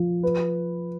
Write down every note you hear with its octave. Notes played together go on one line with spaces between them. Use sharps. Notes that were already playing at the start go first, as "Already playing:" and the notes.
Already playing: F3
B4